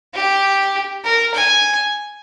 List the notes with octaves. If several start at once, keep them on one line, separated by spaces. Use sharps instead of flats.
G4
A#4
G#5